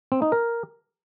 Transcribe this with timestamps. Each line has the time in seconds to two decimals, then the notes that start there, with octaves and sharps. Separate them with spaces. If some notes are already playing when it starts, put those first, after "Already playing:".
0.12 C4
0.22 D#4
0.32 A#4